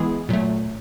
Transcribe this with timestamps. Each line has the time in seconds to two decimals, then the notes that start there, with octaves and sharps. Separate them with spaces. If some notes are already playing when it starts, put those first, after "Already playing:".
Already playing: E3 G#3 B3 E4 G#4
0.29 A#2 F#3 A3